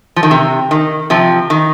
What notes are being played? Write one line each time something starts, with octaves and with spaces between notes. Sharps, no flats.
F3
D#3
C3
D#3
C3 F3
D#3